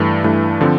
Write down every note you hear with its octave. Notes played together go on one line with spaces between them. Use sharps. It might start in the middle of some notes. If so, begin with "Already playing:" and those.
Already playing: G2 E3 A3
G2 E3 A3
D3 F3 C4